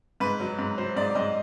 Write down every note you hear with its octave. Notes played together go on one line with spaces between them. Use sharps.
G#2 B4
F#3
G#2
F#3 C5
G#2 D5
G#2 D#5